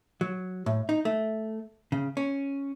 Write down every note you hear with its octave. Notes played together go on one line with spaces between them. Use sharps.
F#3
A2
D#4
A3
C#3
C#4